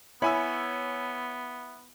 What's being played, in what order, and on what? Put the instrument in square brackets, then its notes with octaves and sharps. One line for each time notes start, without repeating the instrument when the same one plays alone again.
[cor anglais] B3 [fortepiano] E4 B5 [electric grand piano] C#5 G#5 E6